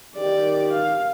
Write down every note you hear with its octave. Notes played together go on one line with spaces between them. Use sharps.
D#3 G4 D5
F5